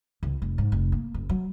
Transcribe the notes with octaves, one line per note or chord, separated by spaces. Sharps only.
C#2
F1
G#2
F1
A#3
F#1
F#3